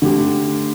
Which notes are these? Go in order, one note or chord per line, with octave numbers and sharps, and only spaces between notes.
D3 A3 G4